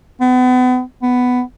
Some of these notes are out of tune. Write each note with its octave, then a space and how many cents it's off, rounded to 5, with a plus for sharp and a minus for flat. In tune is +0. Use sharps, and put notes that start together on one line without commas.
B3 +35
B3 +10